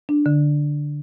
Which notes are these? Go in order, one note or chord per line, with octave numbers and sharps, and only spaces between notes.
D4
D3